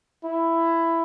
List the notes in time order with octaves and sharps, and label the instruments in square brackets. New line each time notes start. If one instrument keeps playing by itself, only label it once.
[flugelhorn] E4